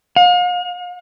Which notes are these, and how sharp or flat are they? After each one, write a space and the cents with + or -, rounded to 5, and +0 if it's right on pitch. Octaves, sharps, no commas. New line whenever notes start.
F5 +40